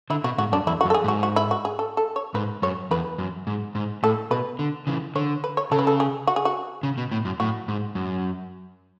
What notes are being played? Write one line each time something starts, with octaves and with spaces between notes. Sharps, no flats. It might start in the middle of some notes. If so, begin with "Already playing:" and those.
D3 E4
B2 F#4
G#2 F#4
F#2 D4
E2 E4
F#4
F#2
A4
G#4
G#2 F#4
F#4
E4
F#4
G#4
A4
A4
C#5
G#2 B4
F#2 C#5
E2 B4
F#2
G#2
G#2
A2 A4
B2 B4
D3
C#3 E3
D3 C#5
B4
C#5
C#3 A4
B4
A4
G#4
F#4
G#4
F#4
C#3
B2
A2
F#2
A2 F#4
G#2
F#2